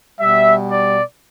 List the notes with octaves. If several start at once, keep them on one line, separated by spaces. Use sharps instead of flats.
B2 G3 E5
D5